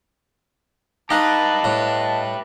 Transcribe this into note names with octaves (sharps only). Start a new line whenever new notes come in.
D#4 G4 B4 D#5 F5 A5 F#6
A2